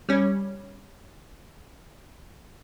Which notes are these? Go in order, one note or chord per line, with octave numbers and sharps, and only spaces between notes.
G3 C#4